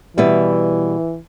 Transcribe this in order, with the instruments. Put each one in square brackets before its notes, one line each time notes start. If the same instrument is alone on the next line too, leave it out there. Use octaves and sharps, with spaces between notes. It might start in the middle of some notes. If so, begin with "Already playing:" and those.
[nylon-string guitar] B2 G3 E4 B4 [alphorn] E3